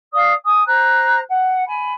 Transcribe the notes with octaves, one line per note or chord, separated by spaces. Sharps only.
D5 F5 D#6
G#5 D#6
C5 A#5 F#6
F#5
G#5 B5